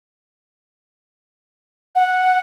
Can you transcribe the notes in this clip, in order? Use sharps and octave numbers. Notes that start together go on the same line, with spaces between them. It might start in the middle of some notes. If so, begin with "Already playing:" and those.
F#5